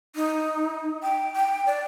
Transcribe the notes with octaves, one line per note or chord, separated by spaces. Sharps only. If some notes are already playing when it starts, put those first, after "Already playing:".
D#4
G5
G5
D5